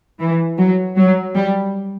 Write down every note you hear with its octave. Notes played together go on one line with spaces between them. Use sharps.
E3
F#3
F#3
G3